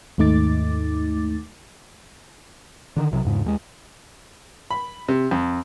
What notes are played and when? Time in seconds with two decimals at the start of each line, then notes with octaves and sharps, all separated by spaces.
0.18 D#2 G#2 A3 D#4 D6 A6
2.96 D3 D#3
3.12 B1 C3 E3 F#3
3.25 E2 G#2 C#3
3.45 D#2 G3 G#3
4.71 B5
5.09 C3
5.31 F2